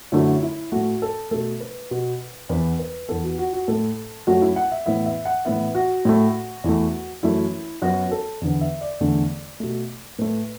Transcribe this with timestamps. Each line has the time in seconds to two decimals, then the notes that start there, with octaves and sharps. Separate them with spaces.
0.12 F#2 D3 F#3 A3 E4
0.42 E4
0.72 A2 A3 F#4
1.02 A4
1.31 B2 A3 A4
1.60 B4
1.91 B2 B3
2.49 E2 E3 B3 B4
2.79 B4
3.09 E2 E3 B3 A4
3.24 F#4
3.38 F#4
3.53 F#4
3.68 A2 A3 A4
4.27 F#2 F#3 A3 F#4
4.42 E4
4.56 F#5
4.72 E5
4.86 A2 E3 B3 E5
5.06 E5
5.25 F#5
5.45 A2 E3 B3 E5
5.75 F#4
6.05 A2 A3
6.64 E2 E3 A3
7.23 F#2 E3 A3 E4
7.82 F#2 F#3 B3 F#4
8.11 A4
8.41 E2 D3 B3
8.61 E5
8.81 D5
9.00 E2 D3 A3
9.60 B2 A3
10.19 A2 A3 B4